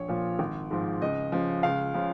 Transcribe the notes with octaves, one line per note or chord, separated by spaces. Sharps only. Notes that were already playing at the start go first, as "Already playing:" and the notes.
Already playing: A#1 C#5
A#2 F3
G#1
G#2 F3
C#2 D#5
C#3 F3
C#2 F5
C#3 F3